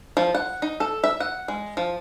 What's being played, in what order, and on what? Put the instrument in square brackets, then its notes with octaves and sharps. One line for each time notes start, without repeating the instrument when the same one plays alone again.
[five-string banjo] F3
F#5
D#4
A4
E5
F#5
G#3
F3